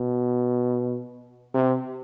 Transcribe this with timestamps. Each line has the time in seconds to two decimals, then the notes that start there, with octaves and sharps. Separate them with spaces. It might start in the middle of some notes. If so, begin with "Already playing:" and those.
Already playing: B2
1.54 C3